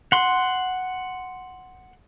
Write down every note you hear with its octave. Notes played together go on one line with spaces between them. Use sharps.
F#5 C6